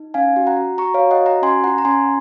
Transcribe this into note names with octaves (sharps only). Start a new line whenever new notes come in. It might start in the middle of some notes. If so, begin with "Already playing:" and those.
Already playing: D#4
C#4 F5 G#5
F#4
F#5 A#5
F#4
F#4 A#5 C#6
C#5 F5
F#4
D#5 F#5
F#4
F#5 A#5
C#4 G#5 C6
F4 F#5 A#5
A#5
C#4 G#5 C6